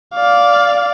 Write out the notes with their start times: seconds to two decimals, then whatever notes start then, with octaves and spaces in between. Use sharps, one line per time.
0.14 D5 F5